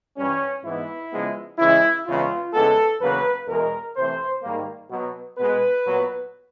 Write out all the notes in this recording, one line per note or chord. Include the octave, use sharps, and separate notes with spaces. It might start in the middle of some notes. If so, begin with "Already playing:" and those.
G2 E3 G3 C#4
G#2 E3 G#3 B3 E4
C#3 F3 G#3 B3
C#3 E3 G#3 E4
E2 C#3 E3 G#3 B3 F4
E2 C#3 E3 G#3 B3 A4
E2 C#3 F#3 A#3 B4
E2 B2 G#3 A#4
C3 E3 A3 C5
G#2 D#3 G3 A#3
B2 F#3 B3
B2 G#3 B3 B4
A#2 F#3 B3